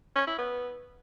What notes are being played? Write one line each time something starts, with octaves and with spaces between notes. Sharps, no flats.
C#4
E4
B3